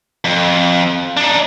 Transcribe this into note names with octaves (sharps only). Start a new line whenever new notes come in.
F2
D4 D#4